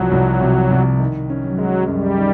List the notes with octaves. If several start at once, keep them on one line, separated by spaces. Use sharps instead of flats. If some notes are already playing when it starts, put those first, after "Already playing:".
Already playing: C2 C3 F3 F#3
C2
C3
C2
D#3
C#4
F#3
G#3
F#2 G3
D#3